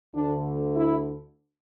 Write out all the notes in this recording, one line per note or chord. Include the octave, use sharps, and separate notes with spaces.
D2 D3 D4
E4